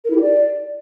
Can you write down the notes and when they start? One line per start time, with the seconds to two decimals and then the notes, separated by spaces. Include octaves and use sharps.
0.04 A#4
0.10 E4
0.16 G4
0.21 D5